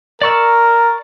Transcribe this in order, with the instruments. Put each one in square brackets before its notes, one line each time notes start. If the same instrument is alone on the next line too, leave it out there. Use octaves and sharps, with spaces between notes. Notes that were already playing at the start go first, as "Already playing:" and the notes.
[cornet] A#4 [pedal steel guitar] D5 C#6 E6